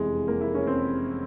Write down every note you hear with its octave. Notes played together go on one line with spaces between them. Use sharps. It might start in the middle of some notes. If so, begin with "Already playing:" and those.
Already playing: F1 E2 C3 E3 G#3
A#3
E4
C#4
C4